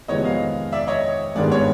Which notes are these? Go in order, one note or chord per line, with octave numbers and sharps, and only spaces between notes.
F2 C3 D#3 G#3 B3 C#5 D#5
D#5 F5
D5 E5
C#5 D#5
G#1 G2 D#3 G#3 B3 D5
C#5